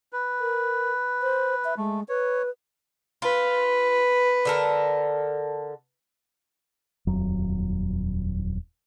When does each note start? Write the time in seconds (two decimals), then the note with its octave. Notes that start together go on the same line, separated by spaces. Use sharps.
0.13 B4
0.40 A#4
1.22 C5
1.65 E5
1.77 G#3 A3
2.09 B4 C#5
3.22 F4 B4
4.45 D3 A4 A#4
7.07 D#1 F2 F#3